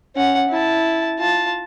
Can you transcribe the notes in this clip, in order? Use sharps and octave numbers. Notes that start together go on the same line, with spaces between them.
C#4 F#5
E4 A5
F4 A5